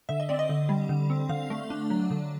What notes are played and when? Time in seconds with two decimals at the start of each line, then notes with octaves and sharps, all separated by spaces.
0.09 D3 E5
0.20 D#5
0.29 C4 D5
0.39 D#5
0.49 D3
0.69 G3
0.89 D3
1.10 C4
1.29 D3 F5
1.50 A3
1.70 D4
1.90 F#3
2.10 D3